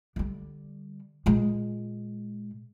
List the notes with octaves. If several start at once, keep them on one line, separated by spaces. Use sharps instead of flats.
D3 G3
A#2 G#3